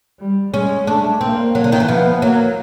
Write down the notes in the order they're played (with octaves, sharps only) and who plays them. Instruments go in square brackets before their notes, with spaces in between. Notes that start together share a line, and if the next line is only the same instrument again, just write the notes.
[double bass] G3
[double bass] G#3 [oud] C#4
[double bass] A3 [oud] D4
[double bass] A#3 [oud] C4
[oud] F#3
D3
D#3
E3
[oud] F3 [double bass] B3
[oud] F#3 [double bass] A#3